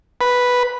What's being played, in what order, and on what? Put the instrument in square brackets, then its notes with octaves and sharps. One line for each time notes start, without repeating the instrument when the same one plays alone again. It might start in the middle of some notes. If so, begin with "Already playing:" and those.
[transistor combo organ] B4